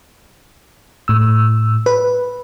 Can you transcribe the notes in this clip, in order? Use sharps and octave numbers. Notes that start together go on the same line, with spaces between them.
A2 E6
B4